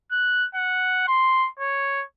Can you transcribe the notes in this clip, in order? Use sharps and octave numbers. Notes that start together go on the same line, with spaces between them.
F#6
F#5
C6
C#5